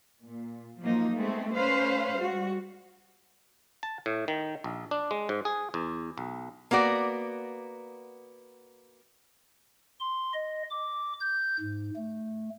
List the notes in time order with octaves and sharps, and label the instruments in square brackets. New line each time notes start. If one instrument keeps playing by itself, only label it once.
[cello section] A#2
F3 F#3 A#3 D#4
G#3 A3 B3 C4
A3 C#4 B4 C5 F5
G3 G#3 F#4
[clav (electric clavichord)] A5
A2
D#3
A#1
D4
G#3
G#2
G#4
E2
B1
[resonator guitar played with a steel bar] A#3 B3 F#4 D5
[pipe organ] C6
D#5
D6
G6
G#2
A3